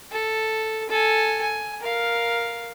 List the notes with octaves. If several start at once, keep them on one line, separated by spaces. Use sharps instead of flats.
A4
A4 G#5
G#5
A#4 F5